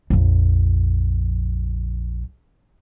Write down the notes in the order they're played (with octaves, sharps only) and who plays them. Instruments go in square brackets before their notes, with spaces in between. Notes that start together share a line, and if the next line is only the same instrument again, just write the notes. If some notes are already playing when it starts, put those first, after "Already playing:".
[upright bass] A#1 F2